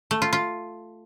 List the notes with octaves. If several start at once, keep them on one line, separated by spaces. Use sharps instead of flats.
A3
F4
F4